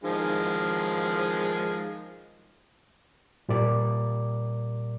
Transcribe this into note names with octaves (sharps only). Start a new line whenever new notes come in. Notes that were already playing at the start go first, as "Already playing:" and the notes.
D#3 F3 G#3
A#2 G3 A#4 D5